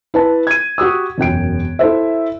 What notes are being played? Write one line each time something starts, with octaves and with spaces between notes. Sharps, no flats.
E4 B4 A5
G#6 D#7
F#4 G4 D#6 E6
E1 F#2 G5 D7
E4 A4 C5 E5